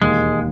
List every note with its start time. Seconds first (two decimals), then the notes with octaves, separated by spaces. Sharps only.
0.01 E1 D#2 D#3 G#3 A#3